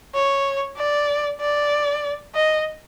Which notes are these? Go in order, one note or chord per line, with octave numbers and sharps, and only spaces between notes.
C#5
D5
D5
D#5